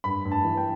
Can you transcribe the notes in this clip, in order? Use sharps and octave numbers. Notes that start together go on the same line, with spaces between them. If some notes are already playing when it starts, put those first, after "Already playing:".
G2 B5
G2
A5
E3
G5